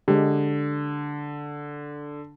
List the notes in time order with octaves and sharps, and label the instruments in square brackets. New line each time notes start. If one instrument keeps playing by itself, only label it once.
[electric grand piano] D3 [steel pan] G#3 G4